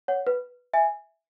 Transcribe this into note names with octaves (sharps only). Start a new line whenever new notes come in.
C#5 F#5
B4
E5 G#5